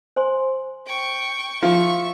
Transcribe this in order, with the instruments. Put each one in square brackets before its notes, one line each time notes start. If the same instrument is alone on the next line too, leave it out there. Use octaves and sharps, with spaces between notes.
[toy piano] C5 G#5 C6
[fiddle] G5 C#6
[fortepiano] F3 F4 [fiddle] E5 C#6